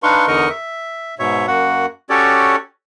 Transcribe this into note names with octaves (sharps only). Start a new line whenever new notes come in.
D4 D#4 B4 F5 C6 C#6
E2 D3 D#4 A#4 D#5 C#6
E5
G#2 B2 C#5 E5
F#2 A#3 F#4 F#5
C#4 F#4 G4 A4 C#5 D5